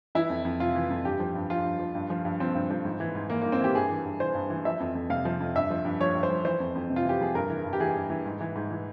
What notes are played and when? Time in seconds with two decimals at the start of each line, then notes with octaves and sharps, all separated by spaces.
0.15 E3 E4
0.30 F2
0.45 F2
0.60 C3 F4
0.75 E3
0.90 F2
1.05 G2 G4
1.20 F3
1.35 G2
1.50 F3 F4
1.65 G2
1.79 F3
1.95 G2
2.10 F3
2.25 G2
2.40 F3 C4
2.55 G2
2.71 F3
2.85 G#2
3.00 E3
3.15 G#2
3.30 E3 A#3
3.42 G#2 A#3
3.52 C4
3.61 E3 G4
3.75 G2 G#4
3.90 E3
4.06 G2
4.20 E3 C5
4.35 G2
4.50 E3
4.65 F3 E5
4.80 F2
4.95 F2
5.10 C3 F5
5.25 F3
5.40 F2
5.55 G2 E5
5.70 F3
5.85 G2
6.00 F3 C#5
6.15 G2
6.23 C5
6.30 F3
6.45 E3 C5
6.60 F2
6.75 F2
6.90 C3
6.96 F4
7.05 E3 G4
7.21 F2 G#4
7.35 G2 A#4
7.50 E3
7.65 G2
7.73 G4
7.80 E3 G#4
7.95 G2
8.10 E3
8.26 G#2
8.40 E3
8.55 G#2
8.71 E3